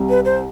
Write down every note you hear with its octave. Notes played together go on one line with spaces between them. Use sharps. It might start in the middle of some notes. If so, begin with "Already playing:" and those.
Already playing: C2 C3 G3
B4
C5